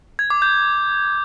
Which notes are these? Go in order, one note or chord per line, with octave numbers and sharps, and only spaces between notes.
G#6
D6
G6